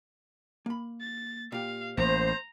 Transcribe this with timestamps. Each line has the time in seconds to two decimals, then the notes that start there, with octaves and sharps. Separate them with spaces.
0.66 A#3 B5
1.01 A6
1.52 A#2 G4 F5
1.97 A1 A#3 C5 A#5